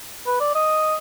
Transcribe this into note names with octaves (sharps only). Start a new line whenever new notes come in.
B4
D5
D#5